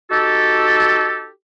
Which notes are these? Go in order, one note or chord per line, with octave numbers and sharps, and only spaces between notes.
D#4 F#4 G4 A4